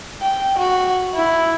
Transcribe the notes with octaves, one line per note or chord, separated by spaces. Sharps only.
G5
F#4
E4